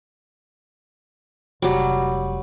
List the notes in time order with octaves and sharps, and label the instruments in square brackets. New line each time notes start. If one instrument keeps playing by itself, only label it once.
[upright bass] F1 [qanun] F#3 G3